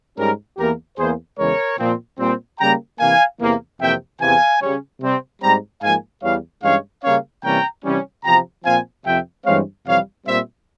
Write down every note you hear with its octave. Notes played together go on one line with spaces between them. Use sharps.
G#2 G3 C#4 G4 A#4
E2 E3 A#3 G4 A#4
E2 E3 A#3 G#4 C5
E2 C#3 E3 G#3 A#4 C#5
A#2 F3 C4
A#2 G3 C4
C#3 G3 A#3 G5 A#5
C3 E3 A#3 F5 G#5
E2 C3 E3 A#3
F2 C3 E3 A#3 E5 G5
E2 C3 E3 F5 G#5
C#3 G3 C#4
C3 G3 C4
G#2 G3 C4 G5 A#5
G#2 F3 A#3 F5 G#5
E2 E3 G3 C#5 F5
G2 E3 G#3 C#4 C#5 F5
C#3 G3 A#3 C#4 C#5 F5
C3 E3 G3 A#3 C#4 G5 A#5
C3 E3 G3 C#4
E2 C3 F3 G5 A#5
A#2 F3 C4 F5 G#5
F2 C3 F3 C4 E5 G5
G2 E3 G#3 C4 C#5 F5
F2 C3 E3 G3 C#5 F5
A#2 G3 C4 C5 E5